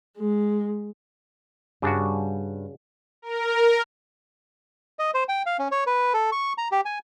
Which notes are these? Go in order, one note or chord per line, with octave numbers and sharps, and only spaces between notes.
G#3
G2 C#3 G3 D4 F#4
A#4
D#5
C5
G5
F5
C#4
C#5
B4
A4
C#6
A#5
G4
G#5